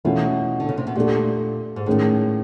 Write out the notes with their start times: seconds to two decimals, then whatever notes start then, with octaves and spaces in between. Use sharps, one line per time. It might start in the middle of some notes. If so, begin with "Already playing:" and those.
0.05 B2 E3 A3 C#4 F4 A4
0.60 D3
0.69 C#3
0.77 C3
0.87 B2
0.96 A#2 A3 D4 G4
1.76 G#2
1.86 A2 D#3 G#3 C#4